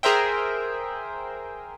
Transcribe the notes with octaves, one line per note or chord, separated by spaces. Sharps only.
G#4 A#4 C5 E5 G5